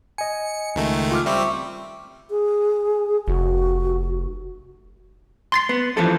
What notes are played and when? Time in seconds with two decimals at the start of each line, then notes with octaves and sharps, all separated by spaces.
0.18 D#5 G#5 C#7
0.75 C#2 D#3 A3
1.11 F4 D6 F6
1.26 G3 C4 E5 C#6 D6
2.30 G#4
3.28 F1 F#4
5.52 C6 A6 C7
5.69 B3
5.97 E3 F3 A4